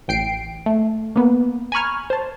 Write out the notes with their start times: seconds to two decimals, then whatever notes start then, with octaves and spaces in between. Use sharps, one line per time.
0.08 A1 G5 C7 D7
0.66 A3
1.16 A#3 B3 B4
1.72 G#5 A#5 B5 C#6 F6 G#6
2.10 C5 A5